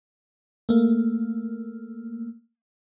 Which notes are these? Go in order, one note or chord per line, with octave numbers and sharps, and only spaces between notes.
A3 A#3